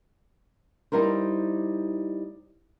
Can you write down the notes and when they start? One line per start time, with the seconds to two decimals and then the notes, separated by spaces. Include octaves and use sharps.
0.92 G3 D#4 E4 A#4 C5